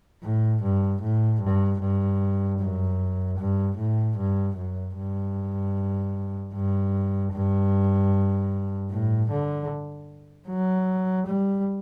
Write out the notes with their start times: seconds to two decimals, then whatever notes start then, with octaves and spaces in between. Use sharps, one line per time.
0.23 A2
0.63 G2
1.02 A2
1.42 G2
1.81 G2
2.60 F#2
3.38 G2
3.77 A2
4.18 G2
4.57 F#2
4.97 G2
6.54 G2
7.33 G2
8.91 A2
9.31 D3
10.48 F#3
11.27 G3